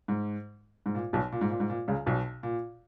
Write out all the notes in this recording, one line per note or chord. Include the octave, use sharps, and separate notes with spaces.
G#2
G#2
A#2
B1 B2
A#2
G#2
A#2
G#2
A#2
C#2 C#3
B1 B2
A#2